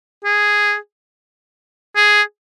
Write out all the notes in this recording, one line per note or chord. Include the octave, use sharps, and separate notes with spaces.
G#4
G#4